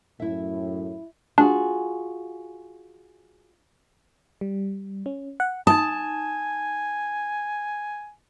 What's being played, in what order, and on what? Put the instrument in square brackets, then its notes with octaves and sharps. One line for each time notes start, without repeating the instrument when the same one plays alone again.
[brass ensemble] F#2 A2 [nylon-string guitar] E4 E5
[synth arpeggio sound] D4 [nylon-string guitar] F4 F#4 G#4
[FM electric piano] G3
C#4
F#5
[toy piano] D#4 D#6 [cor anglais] G#5 [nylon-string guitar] A5